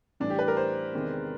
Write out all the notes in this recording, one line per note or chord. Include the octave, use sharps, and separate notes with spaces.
A2 E3 G3 D4
G4
B4
A#4
C5
E2 C3 D#3 G#3